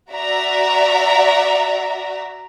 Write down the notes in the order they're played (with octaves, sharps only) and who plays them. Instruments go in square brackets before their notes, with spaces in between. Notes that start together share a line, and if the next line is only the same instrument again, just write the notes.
[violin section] F#4 D5 E5 A#5